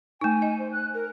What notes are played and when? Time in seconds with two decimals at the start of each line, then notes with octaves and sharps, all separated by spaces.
0.21 A3 D#4 G#5
0.42 D#5
0.59 C5
0.72 F#6
0.94 A#4